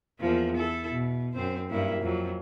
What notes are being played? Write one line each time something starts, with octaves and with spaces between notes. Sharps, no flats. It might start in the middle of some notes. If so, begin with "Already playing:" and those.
E2 F3 A#3
E4 A4
B2
F#2 C4 C5
G2 A#3 E4
F2 F#3